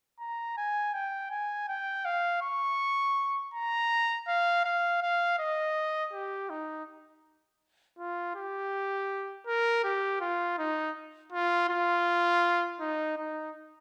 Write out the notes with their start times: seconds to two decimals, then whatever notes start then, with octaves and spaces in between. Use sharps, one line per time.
0.20 A#5
0.57 G#5
0.94 G5
1.31 G#5
1.68 G5
2.05 F5
2.42 C#6
3.54 A#5
4.27 F5
4.65 F5
5.02 F5
5.39 D#5
6.13 G4
6.50 D#4
7.98 F4
8.35 G4
9.47 A#4
9.84 G4
10.21 F4
10.58 D#4
11.32 F4
11.69 F4
12.80 D#4
13.17 D#4